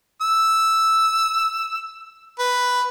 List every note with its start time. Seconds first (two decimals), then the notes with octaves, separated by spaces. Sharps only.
0.21 E6
2.39 B4